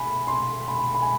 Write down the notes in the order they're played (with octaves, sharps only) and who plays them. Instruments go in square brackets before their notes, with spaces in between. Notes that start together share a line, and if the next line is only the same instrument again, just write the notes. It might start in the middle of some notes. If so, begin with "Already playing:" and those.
Already playing: [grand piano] G#5 B5
C6
B5
B5
G#5